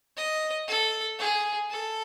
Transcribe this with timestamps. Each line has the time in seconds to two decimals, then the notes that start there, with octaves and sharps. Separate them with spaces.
0.17 D#5
0.67 A4
1.19 G#4
1.70 A4